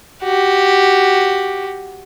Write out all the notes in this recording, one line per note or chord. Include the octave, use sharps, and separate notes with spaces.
F#4 G4